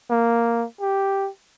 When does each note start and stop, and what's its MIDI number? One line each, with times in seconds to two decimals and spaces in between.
0.10 0.65 58
0.80 1.29 67